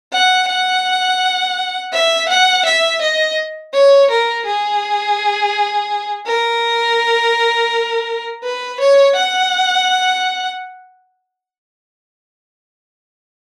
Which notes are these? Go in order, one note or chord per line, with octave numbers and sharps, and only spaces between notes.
F#5
F#5
E5
F#5
E5
D#5
C#5
A#4
G#4
A#4
B4
C#5
F#5